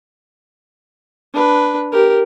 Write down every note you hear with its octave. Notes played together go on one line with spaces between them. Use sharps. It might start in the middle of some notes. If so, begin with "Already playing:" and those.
D4 B4
G4 A#4